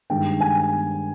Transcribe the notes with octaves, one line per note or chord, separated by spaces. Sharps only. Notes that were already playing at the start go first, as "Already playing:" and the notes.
G2 D#3 G#3 G5
G#5